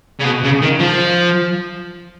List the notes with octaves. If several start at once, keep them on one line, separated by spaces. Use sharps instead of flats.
C#3
B2
C#3
D#3
F3